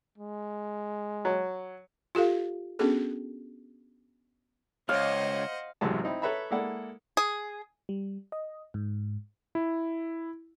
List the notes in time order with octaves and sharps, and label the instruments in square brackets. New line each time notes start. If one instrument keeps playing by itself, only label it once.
[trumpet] G#3
[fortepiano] F#3
[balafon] F4 G4 A4 F5
B3 C#4 D4 F#4 G#4 A4
[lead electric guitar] C#2 [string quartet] C5 D#5 F#5 [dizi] C#5 [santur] F5
[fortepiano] A1 F#2 C3 F#3 G#3 A5
C4 D#4 E4
A4 B4 C#5 E5 A#5 B5
G#3 A#3 E4 A4 D5 F#5
[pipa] G#4
[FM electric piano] G3
D#5
G#2
[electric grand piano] E4